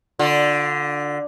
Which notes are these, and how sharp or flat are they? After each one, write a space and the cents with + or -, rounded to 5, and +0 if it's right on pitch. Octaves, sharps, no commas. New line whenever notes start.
D3 +0 F4 +30